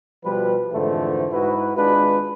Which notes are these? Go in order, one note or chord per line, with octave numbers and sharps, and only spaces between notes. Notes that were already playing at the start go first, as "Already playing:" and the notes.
B2 F3 G3 B4
F2 G#2 D3 E3 A3 C5
G#2 E4 F#4 B4
G#1 G#3 D4 F4 B4